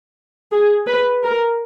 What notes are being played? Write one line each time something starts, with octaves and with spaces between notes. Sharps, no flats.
G#4
B4
A#4